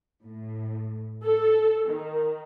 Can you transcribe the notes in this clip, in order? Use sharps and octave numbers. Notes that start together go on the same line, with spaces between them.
A2
A4
D#3